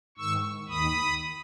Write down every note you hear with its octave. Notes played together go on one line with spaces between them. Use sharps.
G#2 D#3 C#6 E6
D#2 D#3 B5 D#6